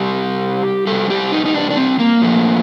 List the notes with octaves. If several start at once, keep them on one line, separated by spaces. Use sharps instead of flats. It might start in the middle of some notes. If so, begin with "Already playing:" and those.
Already playing: C3 G3 G4
C3 G3 A4
G4
D#4
D#4
D4
D4
C4
A#3
A#2 F3 A3